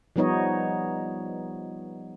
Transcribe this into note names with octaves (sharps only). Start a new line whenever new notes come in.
F3 G3 B3 D#4 C#5 D#5